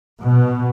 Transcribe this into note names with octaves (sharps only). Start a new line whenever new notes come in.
B2